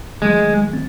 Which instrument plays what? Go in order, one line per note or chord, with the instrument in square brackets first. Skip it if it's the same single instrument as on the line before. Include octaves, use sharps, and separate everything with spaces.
[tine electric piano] D#3 F#3 A3 [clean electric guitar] G#3
[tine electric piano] C4